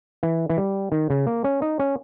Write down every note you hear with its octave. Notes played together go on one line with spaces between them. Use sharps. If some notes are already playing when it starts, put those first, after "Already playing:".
E3
E3
G3
D#3
C#3
A#3
C#4
D#4
C#4